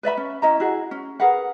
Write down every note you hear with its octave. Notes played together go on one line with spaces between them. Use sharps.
B4 D5 E5 B5
C#4
C#4 E4 D#5 A#5
E4 F#4 G#4
C#4
G#4 A#4 B4 F#5